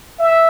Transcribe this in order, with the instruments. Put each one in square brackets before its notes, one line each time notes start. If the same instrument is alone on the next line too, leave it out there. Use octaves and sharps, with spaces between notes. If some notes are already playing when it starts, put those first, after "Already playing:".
[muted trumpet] E5